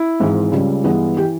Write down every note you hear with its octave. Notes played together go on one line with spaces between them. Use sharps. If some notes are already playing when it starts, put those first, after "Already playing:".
Already playing: E4
G#1 G#2 E3 G#3
C#2 C#3 G3
G2 E3 G#3 B3
E3 G4